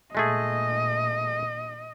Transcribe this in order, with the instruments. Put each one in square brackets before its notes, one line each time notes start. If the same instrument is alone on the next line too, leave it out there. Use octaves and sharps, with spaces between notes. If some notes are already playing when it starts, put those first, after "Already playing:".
[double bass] A#2 [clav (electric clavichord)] G#3 A3 G#4 [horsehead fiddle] D#5